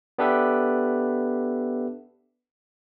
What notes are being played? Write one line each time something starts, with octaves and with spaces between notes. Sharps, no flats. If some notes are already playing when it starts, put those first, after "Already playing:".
B3 D4 G4 A4 B4 E5